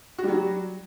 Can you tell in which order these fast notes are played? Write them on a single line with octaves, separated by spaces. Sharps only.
F#4 G3 F#3